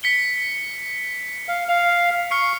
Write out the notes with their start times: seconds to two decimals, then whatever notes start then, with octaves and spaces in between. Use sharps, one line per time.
0.03 B6 C#7 G7
1.48 F5
1.69 F5 F7
2.31 C#6 F6 C7 C#7